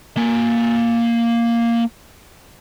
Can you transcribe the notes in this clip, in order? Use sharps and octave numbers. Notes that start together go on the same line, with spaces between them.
A#3 G#5